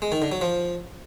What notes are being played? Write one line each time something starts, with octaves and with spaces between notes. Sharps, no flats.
G#3
D#3
D3
F#3
F3